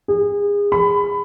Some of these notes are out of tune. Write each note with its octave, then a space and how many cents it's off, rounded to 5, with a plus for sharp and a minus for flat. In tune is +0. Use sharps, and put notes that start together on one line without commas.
G#4 -30
B5 +20